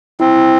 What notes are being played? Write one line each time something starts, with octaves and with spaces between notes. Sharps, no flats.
C4 E4
E4